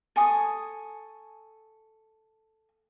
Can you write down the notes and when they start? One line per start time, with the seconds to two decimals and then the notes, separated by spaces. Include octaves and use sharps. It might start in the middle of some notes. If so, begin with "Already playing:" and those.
0.16 A4 G#5 C#6 D#6